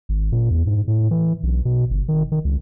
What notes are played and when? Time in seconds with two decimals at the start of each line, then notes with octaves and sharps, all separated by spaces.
0.09 G#1
0.32 A#2
0.50 E2
0.67 G#2
0.87 A2
1.11 E3
1.43 B1
1.65 B2
1.91 G1
2.08 D#3
2.32 D#3
2.45 C#2